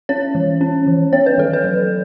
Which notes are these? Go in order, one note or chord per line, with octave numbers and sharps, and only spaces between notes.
C#4 C#5
E3
C#4
E3
B3 C#5
B4
D#3 A4
B4
F#3